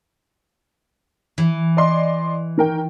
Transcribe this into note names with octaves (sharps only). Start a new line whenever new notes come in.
E3
D5 D#5 C6
D#3 A#4 G5